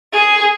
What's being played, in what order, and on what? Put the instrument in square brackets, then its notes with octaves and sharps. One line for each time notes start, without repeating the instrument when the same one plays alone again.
[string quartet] G#4